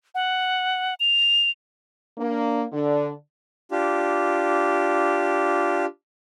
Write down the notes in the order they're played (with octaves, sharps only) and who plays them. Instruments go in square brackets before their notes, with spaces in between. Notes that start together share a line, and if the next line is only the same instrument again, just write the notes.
[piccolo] F#5
F7
[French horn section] A#3 D4
D3 D4
[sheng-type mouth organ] D4 F4 G4